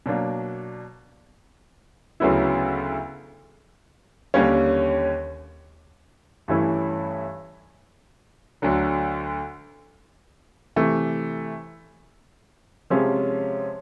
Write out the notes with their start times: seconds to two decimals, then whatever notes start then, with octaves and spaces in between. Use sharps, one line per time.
0.06 B2 F#3 A#3 D4
2.20 D2 C#3 F#3 B3 E4
4.34 D#2 D3 G3 A#3 C#4
6.48 G2 E3 A3 C#4 E4
8.62 D2 D3 F#3
10.76 C3 E3 A3
12.90 C3 F3 G#3 C#4